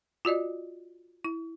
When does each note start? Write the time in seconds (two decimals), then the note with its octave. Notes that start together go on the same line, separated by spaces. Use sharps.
0.25 F4 F#4 D5 D#5
1.24 E4